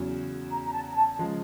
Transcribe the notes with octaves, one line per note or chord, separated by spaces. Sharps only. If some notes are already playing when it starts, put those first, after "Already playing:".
Already playing: E2 C#3 F#3
A#5
A#5
A5
A#5
A5
C#3 F3 G#3 A5